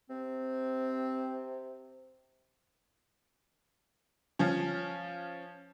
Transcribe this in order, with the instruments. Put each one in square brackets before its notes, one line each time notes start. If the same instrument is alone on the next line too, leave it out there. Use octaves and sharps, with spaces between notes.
[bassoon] C3 [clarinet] C4
[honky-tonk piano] F3 C#4